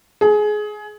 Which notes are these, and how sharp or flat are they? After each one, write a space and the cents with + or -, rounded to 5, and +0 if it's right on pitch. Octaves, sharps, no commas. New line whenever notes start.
G#4 +20